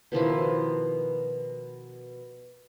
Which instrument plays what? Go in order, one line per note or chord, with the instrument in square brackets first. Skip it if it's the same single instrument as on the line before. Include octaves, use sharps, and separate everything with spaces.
[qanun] B2 D#3 F3 E4